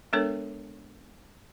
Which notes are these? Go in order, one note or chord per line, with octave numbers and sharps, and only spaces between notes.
G#3 B3 D4 A4 A#4 C#5